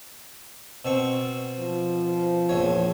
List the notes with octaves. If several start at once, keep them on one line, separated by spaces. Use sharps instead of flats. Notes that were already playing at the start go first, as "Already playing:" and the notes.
B2 C4 C#6
F3
A#1 E2 C#5